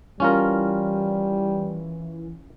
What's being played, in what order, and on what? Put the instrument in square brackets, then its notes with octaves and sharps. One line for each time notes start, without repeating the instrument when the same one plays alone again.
[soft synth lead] E3 [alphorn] G3 [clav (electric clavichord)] C#4 F4 A#4